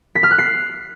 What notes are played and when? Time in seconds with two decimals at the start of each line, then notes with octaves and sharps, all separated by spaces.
0.15 B6
0.23 F6
0.31 F#6
0.38 C7